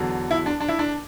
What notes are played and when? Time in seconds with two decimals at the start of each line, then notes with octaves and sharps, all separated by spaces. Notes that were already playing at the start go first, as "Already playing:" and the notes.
Already playing: E2 D3 F#3
0.31 E4
0.46 D4
0.60 D4
0.68 E4
0.79 D4